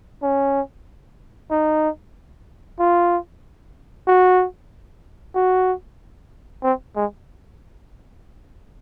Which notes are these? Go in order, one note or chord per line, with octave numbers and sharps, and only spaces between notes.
C#4
D#4
F4
F#4
F#4
C4
G#3